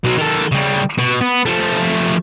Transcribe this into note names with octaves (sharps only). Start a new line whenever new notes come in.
B2 F#3
D#3 A4
C#3 G3
B2
B3
F3 A3